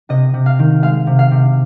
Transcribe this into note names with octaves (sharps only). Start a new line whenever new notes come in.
C3 D#5
C3
F5
D#3
G#3 F5
C3
F5
C3